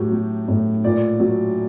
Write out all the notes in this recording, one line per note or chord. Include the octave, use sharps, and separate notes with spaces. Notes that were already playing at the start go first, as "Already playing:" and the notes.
Already playing: A2 F#3 G4
F#3
A2
A#2 D5
F#3